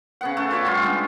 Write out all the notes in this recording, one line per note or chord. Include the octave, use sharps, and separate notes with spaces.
C#3 B3 F#5
C#3 A3 A4
F4 B4 C#5 D5
G3 F4 C6
G#3 B3 D4